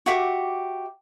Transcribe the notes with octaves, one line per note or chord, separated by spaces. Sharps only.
F#4 G4 E5 D6